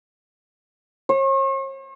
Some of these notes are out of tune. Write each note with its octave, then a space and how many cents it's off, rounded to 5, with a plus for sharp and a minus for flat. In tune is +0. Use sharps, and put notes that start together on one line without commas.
C#5 -45